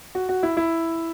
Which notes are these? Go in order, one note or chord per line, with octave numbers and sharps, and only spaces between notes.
F#4
F#4
E4
E4